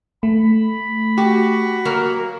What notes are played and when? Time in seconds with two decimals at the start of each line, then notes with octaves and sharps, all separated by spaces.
0.23 A3 B5
1.18 F#4 G4
1.85 F#3 A#3 A#4